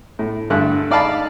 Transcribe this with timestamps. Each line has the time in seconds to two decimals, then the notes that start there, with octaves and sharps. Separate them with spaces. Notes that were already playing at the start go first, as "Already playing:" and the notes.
0.19 A2
0.50 G2 D3 A3 A4 F#6
0.90 D#4 D5 F5 A5 B5